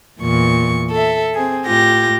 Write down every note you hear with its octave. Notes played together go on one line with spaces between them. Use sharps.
E2 A#2 C#6
A4 E5
C4 G#4
A2 F4 G4 A#6